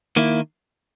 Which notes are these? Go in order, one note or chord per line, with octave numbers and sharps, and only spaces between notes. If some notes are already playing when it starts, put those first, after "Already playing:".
D#3 A#3 E4